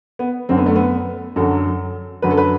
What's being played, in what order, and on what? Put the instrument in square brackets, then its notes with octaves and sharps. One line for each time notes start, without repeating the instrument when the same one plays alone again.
[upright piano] B3
F#2 D3 F#3 C4
B3
A3
B3
F#2 D3 F#3 A4
F#2 D3 F#3 B4
A4
B4